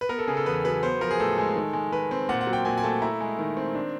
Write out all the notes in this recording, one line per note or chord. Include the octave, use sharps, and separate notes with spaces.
B4
B3 A#4
A4
C#3 G#4
A4
E2 B4
F#3 B4
B3 C5
F3 A#4
G#4
A2 A4
G#3
D#3
G#3
D#3 B4
C4
A#2 F#5
F#5
F#3
G5
A#2 G#5
G#5
A3 A5
E4 A#5
G#3
D#3
C4
D4